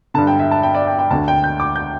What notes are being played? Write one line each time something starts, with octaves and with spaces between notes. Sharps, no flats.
G2 D3 A5
G5
E5
A5
G5
D5
G5
G5
D2 D3 A5
G5
G6
D6
G6